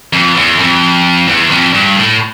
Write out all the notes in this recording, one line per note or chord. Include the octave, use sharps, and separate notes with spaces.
F2
E2
F2
E2
F2
G2
A2